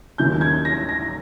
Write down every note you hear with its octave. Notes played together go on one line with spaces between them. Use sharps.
D#2 D#3 F#3 A#3 C#4 G6
G#6
A#6
A#6